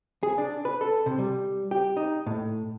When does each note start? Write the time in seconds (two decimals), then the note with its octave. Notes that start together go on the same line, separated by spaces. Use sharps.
0.23 G#4
0.38 D4
0.65 B4
0.81 A4
1.06 C3
1.19 G3
1.71 G4
1.97 D#4
2.26 A2